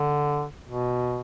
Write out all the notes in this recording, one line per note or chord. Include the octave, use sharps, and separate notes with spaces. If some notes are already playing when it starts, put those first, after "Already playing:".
Already playing: D3
B2